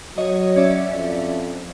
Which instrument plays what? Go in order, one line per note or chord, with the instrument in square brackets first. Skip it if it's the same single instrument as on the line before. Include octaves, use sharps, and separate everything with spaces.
[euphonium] F#3 [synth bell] C#5 D#5
[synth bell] C#4 D5 E5
[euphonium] F2